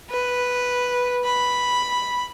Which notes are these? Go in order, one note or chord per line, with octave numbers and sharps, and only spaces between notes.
B4
B5